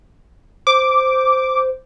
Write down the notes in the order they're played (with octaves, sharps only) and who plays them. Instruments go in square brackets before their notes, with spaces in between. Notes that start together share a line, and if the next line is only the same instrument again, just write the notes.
[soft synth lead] C5 [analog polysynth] D6